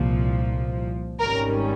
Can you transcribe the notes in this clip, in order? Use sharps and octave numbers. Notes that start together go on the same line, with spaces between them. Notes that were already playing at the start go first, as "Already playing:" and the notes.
Already playing: C2 A#2 F3
G#1 G#2 D#3 G3 C#4 A#4